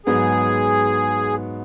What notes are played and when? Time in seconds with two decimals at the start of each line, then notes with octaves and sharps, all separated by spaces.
0.06 G#2 F#3 B3 G#4